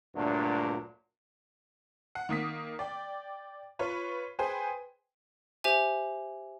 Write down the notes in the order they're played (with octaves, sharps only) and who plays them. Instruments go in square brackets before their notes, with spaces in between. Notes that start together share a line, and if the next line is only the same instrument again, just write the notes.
[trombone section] D2 G2 A#2 F#3 A3 D4
[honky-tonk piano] F#5
D#3 A#3 D#6 B6
D5 G5
F4 B4 C#5
G#4 B4 C5 G5 G#5
[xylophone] G4 C5 E5 G#5